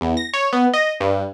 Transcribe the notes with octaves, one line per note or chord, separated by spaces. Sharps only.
E2
A#6
C#5
B3
D#5
G2